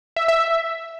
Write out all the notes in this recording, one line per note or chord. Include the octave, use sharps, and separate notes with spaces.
E5
E5
E5